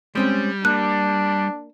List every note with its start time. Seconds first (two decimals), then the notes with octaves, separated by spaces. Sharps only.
0.15 G3 G#3 C4 C#4
0.65 A#3 D4 F#6